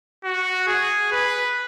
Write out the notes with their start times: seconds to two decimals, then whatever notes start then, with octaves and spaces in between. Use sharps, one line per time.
0.24 F#4
0.68 G#4
1.12 B4